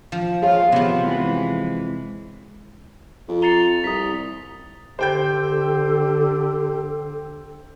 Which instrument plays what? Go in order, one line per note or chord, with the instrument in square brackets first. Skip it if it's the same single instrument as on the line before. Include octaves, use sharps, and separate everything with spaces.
[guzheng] F3
[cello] F4 [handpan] G#4 C#5 F5
[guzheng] C3 F3 [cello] B3
[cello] E3 G#3
[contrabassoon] F2
[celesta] A#5 C7 C#7 [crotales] A6 F7 G7
[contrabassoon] C2 [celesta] A#5 [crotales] D#6 B6
[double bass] D3 [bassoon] G4 [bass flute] A4 [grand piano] C5 G5 G6